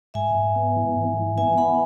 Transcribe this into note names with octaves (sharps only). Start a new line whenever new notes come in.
G#2 E5 G#5
G#2
B3
E3
G#2
E3
B3 E5 G#5
E3 F#5 B5